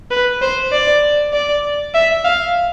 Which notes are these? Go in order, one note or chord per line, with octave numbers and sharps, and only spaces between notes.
B4
C5
D5
D5
E5
F5